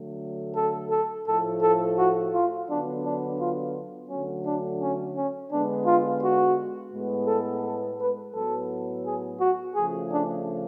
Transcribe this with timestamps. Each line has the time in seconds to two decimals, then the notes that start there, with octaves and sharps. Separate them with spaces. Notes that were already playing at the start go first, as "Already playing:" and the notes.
Already playing: D3 F#3 A3
0.55 A4
0.91 A4
1.26 A2 F3 A3 A4
1.61 A4
1.97 F#4
2.33 F4
2.67 D3 F#3 B3 D4
3.03 D4
3.39 F4
4.09 D3 F#3 A3 C#4
4.44 D4
4.80 C#4
5.16 C#4
5.51 D3 G#3 B3 D4
5.86 F4
6.21 F#4
6.92 A2 G#3 B3
7.27 A4
7.62 A4
7.98 B4
8.33 A2 F#3 B3 A4
9.04 G#4
9.39 F#4
9.74 C#3 F3 A3 G#4
10.10 D4